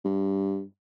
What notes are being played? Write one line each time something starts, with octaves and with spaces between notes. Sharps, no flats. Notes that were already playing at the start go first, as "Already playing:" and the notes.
G2